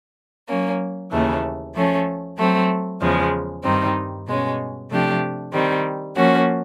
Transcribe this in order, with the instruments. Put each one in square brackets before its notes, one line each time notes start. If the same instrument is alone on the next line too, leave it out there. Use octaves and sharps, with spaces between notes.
[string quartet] F#3 A#3 C#4
D#2 C#3 E3 A3
F3 A3 C#4
F#3 A3 C4
E2 C#3 F3 G#3
G2 D#3 G3 C4 D#4
B2 G#3 C#4
C3 F3 A3 D4 G4
D#3 G3 C4
F3 A#3 C#4 F#4